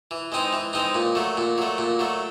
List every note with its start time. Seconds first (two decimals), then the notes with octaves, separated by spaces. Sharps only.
0.11 E3
0.32 G#3 C4 D#4
0.53 E3
0.73 G#3 C4 D#4
0.94 A#2
1.15 F#3 A3
1.37 A#2
1.58 F#3 A3
1.78 A#2
1.99 F#3 A3